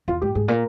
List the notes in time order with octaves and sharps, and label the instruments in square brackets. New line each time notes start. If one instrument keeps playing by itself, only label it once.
[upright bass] E2 [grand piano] F4
[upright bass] G#2 [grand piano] G4
[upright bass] G#2 [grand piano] G#4
[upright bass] A#2 [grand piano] A#4